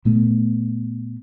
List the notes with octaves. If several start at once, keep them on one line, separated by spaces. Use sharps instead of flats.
A#2 A3 B3